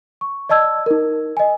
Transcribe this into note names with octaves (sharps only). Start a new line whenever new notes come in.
C#6
D5 D#5 A5 E6 G#6
D#4 A#4
D#5 G#5